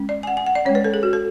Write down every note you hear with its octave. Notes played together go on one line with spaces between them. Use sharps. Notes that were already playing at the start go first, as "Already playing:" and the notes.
Already playing: G#3 C#4
D5
G#5
F#5
G#5
F#5
D5
G#3 C#4 C#5
B4
A4
G#4
F#4
A4